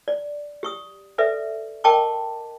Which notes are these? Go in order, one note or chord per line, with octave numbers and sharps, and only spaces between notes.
D5
G4 C#6 D#6
A4 B4 D5 E5
A#4 D#5 G5 A5 C#6 D6